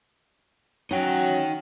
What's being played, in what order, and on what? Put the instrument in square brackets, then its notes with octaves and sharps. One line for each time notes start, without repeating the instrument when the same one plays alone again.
[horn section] F#3 [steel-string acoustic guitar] C#4 [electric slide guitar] D#4 G5